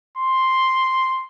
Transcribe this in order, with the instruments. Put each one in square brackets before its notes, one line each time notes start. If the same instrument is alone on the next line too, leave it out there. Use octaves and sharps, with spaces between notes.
[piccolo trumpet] C6